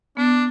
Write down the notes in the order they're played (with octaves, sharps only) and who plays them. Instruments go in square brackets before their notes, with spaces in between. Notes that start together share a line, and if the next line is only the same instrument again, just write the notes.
[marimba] B3 [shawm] D4